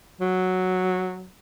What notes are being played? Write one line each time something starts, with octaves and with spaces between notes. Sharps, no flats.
F#3